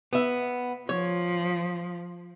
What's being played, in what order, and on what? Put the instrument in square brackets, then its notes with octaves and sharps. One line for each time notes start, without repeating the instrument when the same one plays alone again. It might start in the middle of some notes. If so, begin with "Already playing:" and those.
[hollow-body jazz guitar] B3 E5
[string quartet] F3 [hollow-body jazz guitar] C#5